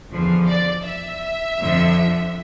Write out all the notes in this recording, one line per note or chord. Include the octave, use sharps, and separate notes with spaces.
E2 D3 F3
D5
E5
F2 D3 F3